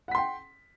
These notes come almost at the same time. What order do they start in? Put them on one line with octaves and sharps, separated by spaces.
F#5 B6 C6 G5